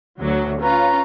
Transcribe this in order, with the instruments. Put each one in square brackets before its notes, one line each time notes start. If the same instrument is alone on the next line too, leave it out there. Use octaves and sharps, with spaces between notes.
[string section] D2 F#3
[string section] C#4 F4 [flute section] B4 A#5 C#6